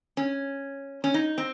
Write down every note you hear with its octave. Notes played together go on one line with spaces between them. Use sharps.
C#4
C#4
D#4
C4